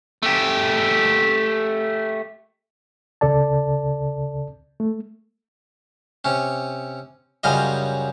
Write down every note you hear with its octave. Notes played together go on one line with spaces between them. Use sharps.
A3 G4
C#2 C#3 A4 D5 A5
A3
C3 C#4
F#2 C#3 G3 F4 D#5